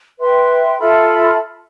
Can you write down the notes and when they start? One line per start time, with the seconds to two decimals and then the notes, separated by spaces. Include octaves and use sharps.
0.18 B4 E5 G5 C6
0.78 F4 A4 E5 B5